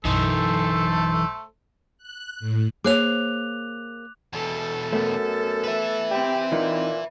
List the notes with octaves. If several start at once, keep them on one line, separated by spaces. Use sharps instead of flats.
B1 F#2 E3 A3 D#4 A4 C5
F#6
A2
A#3 G#4 C5 C#5 D6 F#6 F7
E2 B2 A4
F#2 A3 B3
B4 E5
C4 G4
A#2 E3 D#4